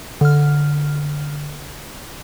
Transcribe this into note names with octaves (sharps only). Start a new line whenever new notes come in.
D3 F6